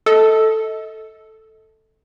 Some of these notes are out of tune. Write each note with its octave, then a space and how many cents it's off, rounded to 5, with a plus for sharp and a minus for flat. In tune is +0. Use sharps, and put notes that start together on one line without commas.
A4 +0 D#5 +35